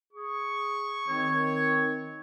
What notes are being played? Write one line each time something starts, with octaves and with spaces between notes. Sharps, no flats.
G#4 C#6
D#3 C4 C#5